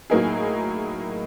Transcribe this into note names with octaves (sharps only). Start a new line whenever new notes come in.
A2 F#3 A#3 D#4 G#4